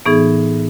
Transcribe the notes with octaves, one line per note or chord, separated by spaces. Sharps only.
A2 E3 B3 D#4 G#4